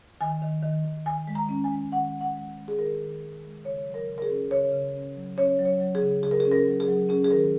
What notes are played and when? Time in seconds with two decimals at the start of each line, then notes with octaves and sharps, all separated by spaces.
0.21 D#3 G#5
0.42 D#3
0.63 D#3
0.84 D#3
1.06 D#3 G#5
1.27 G#3
1.35 A#5
1.49 C#4
1.64 G#5
1.71 G#3
1.92 D#3 F#5
2.14 G#3
2.21 F#5
2.35 G#3
2.57 G#3
2.68 G#4
2.78 D#3 A#4
3.00 D#3
3.22 D#3
3.44 G#3
3.65 C#3 C#5
3.86 F#3
3.94 A#4
4.08 C#3
4.18 A#4
4.22 G#4
4.29 C#4
4.51 C#3 C#5
4.72 C#3
4.95 C#4
5.16 F#3
5.37 C#4 C#5
5.59 F#3
5.65 C#5
5.80 F#3
5.95 G#4
6.02 C#3
6.23 C#3 G#4
6.31 A#4
6.40 G#4
6.45 C#4
6.51 A#4
6.67 F#3
6.80 G#4
6.88 F#3
7.09 C#4 G#4
7.24 G#4
7.31 D#3 A#4